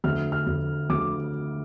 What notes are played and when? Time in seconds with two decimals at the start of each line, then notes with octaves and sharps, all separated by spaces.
0.04 D2 F6
0.32 F6
0.47 D2
0.90 D2 D6